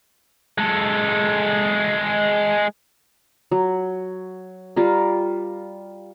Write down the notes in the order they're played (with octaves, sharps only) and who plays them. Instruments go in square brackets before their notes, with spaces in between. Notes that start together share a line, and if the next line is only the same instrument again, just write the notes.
[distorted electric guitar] G#3 A4
[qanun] F#3
G3 F4 A#4